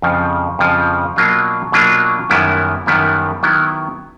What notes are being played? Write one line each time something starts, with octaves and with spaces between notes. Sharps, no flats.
F2 C#3 F3
F2 C#3 F3
B2 F#3 A#3 D4 F4
B2 F#3 A#3 D4 F4
F#2 D#3 G3 B3 E4
F#2 D#3 G3 B3 E4
D#3 F#3 B3 E4